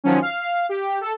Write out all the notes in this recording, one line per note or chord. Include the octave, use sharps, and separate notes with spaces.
D#3 F3 F#3 C#4
F5
G4
A4